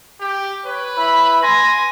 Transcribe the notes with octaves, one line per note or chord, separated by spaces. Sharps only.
G4
B4 C#5
E4 B5
G#5 C6 A#6